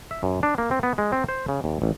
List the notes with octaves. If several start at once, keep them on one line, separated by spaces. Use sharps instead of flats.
E5
F#2
D4
A#3
C4
B3
G#3
C4
C5
C#3
D#2
A1